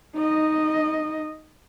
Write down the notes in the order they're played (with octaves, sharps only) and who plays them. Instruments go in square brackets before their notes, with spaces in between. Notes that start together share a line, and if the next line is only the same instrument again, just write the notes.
[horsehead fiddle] D#4 D#5